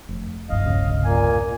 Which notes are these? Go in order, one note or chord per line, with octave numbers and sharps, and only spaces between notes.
F1
C2 G2 D#5 F5
E1 C#3
A#2 A#3 G#5